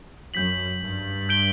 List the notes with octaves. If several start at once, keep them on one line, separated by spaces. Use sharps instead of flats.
F#2 G6 B6 F#7
G2
G6 D7 G7